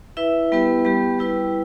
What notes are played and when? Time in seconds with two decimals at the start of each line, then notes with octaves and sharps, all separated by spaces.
0.17 E4 B4 E5
0.52 G3 B3 E4 G4 B4
0.85 G3 B3 G4
1.19 G3 E4 B4